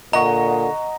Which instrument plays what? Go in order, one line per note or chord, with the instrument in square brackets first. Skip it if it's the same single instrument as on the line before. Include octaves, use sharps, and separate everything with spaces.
[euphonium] A#2 [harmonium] D3 [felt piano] D#5 F#5 C#6 [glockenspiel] A#5